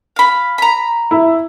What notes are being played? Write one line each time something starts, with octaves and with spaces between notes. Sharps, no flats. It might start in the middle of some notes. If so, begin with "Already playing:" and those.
F5 B5
A#5 B5
E4